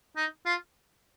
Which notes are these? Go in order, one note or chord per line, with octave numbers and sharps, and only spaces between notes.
D#4
F4